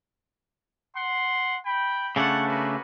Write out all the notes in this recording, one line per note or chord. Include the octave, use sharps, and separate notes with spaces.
F#5 C6
G5 B5
C#3 A3 D4 C#5 F#5
A#3 B3 F#4